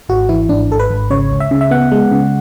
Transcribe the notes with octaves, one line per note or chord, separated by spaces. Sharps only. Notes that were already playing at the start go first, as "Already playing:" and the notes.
G#1 F#4
E3 E4
G#1 D4
G#1 A4
B4
G#1
C#3 C#5
C#2
E5
C#3
E5
B3 F#5
G#3
C#3